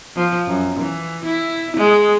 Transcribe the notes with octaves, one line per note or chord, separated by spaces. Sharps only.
F3
F#2
E3
E4
G#3